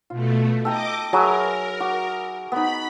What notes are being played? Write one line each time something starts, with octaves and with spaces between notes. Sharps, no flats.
B2 A3 F4
A4 D#5 G5 A#5 D6
F#3 G#4 A#4 B4 E5
F#4 D6
B3 D#4 B5